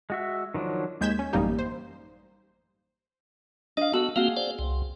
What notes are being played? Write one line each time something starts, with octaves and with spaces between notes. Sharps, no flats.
G#3 F#4 E5
D#3 F3 F#3 D4
D#2 G#3 G6 G#6 B6 E7
C#4
A1 F#2 G3 A#3 D#4 G4
C5
D4 D#5 F5
B3 F#4 A4
A#3 C4 F#4 G#4 F5
C5 D5
C2